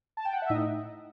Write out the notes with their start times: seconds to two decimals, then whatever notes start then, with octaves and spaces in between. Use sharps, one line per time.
0.17 A5
0.25 G5
0.33 F#5
0.42 E5
0.50 A2 D#4 D#5